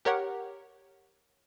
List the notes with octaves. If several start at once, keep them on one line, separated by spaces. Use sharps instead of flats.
G4 A#4 C#5 F#5